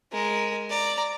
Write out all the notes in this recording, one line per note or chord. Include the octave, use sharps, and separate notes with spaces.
G#3 A#4
D5 A#5